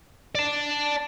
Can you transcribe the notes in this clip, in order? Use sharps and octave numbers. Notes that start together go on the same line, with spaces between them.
D5 A5